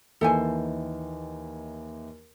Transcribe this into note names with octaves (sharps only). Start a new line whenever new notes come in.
D#2 D#3 E3 A4 C5 G#5